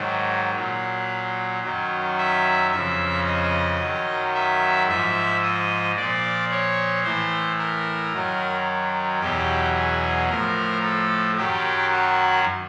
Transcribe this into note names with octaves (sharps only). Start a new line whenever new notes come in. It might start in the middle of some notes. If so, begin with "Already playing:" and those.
Already playing: G#2 D#3 F#3
A#2 F#3
F#2 D#3 F#3
E5
F2 C#3 F3 E5
D#5
F#2 D#3 F#3
E5
G#2 F3 E5
D#5
A#2 F3 D5
C#5
A2 E3 C5
A#4
F#2 D#3 F#3
E2 B2 F#3 G4
G#4
A2 F3 A#4
A4
F#2 D#3 F#3 G4
F#4